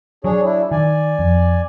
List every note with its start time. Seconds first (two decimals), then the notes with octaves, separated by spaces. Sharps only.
0.24 F#3 D4 G#4 C#5
0.44 D4 E4
0.71 D#3 D5 G#5
1.19 F2